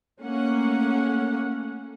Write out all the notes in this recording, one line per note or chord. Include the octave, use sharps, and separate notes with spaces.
A3 A#3 C#4 F#5